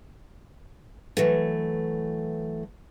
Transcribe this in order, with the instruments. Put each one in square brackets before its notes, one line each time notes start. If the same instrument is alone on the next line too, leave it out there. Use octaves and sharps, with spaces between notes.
[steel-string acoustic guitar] E3 F#3 A3